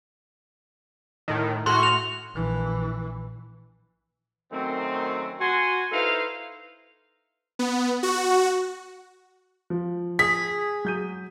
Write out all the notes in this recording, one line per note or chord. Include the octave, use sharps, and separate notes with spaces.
A2 D#3
A2 F#4 C6 F6
F7
A#1 E3
F#2 D#3 A3 C4
F#4 G#5 C6
D#4 E4 A4 B4 C5 F5
B3
F#4
F3
G#4 B6
F#3 G6 D#7